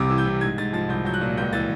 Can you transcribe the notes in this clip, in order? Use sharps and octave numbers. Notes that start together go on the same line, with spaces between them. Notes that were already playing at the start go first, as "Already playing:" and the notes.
Already playing: C2 C3 D6
E3
G6
C3
G#2 G#6
G#2 A6
F3 A6
C2 G6
F#3 G6
F#6
A#2
C#2 G6
E3 A6